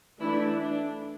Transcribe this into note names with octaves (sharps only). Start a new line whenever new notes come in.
E3 A3 D4 E4
D4